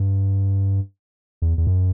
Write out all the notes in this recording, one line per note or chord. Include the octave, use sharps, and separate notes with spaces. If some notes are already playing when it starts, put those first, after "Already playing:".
Already playing: G2
E2
E2
F#2